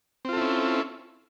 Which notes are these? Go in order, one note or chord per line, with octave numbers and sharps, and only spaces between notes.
C4 C#4 E4 F4 A4